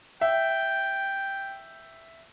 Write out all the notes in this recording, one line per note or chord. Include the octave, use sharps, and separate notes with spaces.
E5 G5